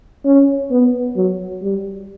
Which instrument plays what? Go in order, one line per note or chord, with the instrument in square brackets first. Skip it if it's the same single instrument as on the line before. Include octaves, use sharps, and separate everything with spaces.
[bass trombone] C#4
B3
F#3
G3